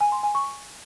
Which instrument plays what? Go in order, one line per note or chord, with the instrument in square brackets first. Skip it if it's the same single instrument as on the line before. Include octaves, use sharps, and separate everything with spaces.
[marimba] G#5
C6
G#5
C#6